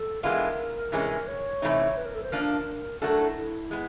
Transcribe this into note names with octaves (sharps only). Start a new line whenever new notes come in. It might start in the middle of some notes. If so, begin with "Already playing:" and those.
Already playing: A4
E3 G#3 B3 D4 F4 A#4
C3 E3 G#3 C#4
C#5
C3 E3 A3 C4 D#4
B4
A#4
A4
C5
F3 A#3 D4 A#4
F#3 A3 D4 F#4 A4 A#4
E4
E4
G#3 B3